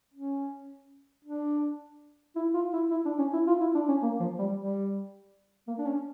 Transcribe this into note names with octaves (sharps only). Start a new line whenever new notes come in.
C#4
D4
E4
F4
E4
E4
D4
C#4
E4
F4
E4
D4
C#4
A#3
F3
G3
G3
A#3
D4
C#4